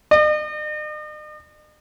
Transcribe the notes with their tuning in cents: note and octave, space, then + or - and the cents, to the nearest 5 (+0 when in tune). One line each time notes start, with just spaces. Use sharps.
D#5 -45